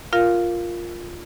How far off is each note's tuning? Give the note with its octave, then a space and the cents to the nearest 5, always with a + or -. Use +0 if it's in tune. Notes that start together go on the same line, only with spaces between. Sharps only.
F4 +0 A#4 +0 F5 +0